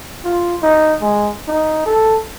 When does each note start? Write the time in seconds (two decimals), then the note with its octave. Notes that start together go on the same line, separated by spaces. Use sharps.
0.25 F4
0.62 D#4
1.02 G#3
1.48 D#4
1.86 A4